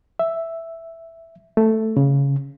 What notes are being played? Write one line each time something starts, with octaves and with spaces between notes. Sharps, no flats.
E5
A3
C#3